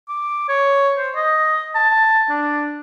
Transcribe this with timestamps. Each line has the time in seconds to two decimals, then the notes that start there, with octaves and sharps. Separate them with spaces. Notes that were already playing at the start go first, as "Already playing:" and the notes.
0.08 D6
0.49 C#5
0.98 C5
1.15 D#5
1.75 A5
2.30 D4